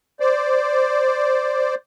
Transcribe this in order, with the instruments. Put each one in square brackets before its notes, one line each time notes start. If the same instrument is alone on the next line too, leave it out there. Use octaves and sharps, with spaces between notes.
[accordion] C5 D5